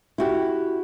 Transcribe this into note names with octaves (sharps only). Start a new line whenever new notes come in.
E4 F#4 G4